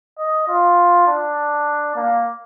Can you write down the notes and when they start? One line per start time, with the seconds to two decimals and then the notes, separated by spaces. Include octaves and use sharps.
0.19 D#5
0.48 F4
1.07 D4
1.96 A#3